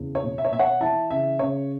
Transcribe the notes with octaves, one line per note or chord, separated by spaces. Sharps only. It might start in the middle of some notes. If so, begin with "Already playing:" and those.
Already playing: E2 C#3
C#5
B2
E5
C#5
B2 E5
C#5 F#5
E3 E5 A5
C#3 E5
C#3 C#5